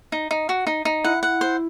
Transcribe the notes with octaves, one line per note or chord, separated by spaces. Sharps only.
D#4
D#4
F#4
D#4
D#4
E4 F#5
F#5
C5